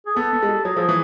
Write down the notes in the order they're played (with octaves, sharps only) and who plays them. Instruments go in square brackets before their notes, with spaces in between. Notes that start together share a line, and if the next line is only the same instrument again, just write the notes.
[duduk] G#4
[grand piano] B3 [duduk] A4
[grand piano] B3
G#3
G3
[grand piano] F#3 [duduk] G#4
[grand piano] F3 [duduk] A4
[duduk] G#4
[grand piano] E3